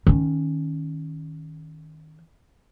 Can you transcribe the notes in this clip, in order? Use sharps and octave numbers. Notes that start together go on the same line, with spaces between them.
D#3 C#4